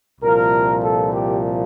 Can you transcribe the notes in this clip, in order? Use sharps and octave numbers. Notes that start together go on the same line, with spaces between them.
C2 A#2 F3 A#4
A4
G4